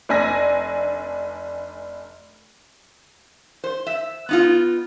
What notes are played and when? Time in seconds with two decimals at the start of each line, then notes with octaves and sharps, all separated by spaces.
0.09 F1 D4 G#5 E6 A#6
3.64 C5
3.87 E5
4.29 B3 D#4 F4